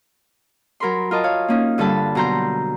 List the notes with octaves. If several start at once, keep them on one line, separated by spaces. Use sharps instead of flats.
F#3 A#4 B5 C6
F4 A#4 D#5 A5
C#5 F5
A#3 C#4 D#4
G2 D3 G3 A4 A5 B5
B2 F#3 A#5 C6 G6